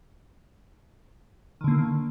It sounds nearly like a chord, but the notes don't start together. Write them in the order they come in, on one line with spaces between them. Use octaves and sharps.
D#3 D3 A#3